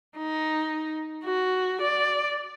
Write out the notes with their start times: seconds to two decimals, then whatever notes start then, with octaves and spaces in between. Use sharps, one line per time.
0.17 D#4
1.25 F#4
1.81 D5